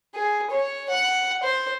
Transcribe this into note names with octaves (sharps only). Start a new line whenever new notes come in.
G#4
C#5
F#5
C5